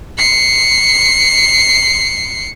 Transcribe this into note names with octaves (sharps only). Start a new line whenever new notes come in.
C7 C#7